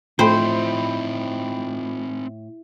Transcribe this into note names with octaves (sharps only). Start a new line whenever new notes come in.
A2 F3 C4 D#4 C5 G5 B5